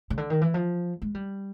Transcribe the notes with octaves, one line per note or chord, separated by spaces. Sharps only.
C#3
D3
D#3
E3
F3
G#3
G3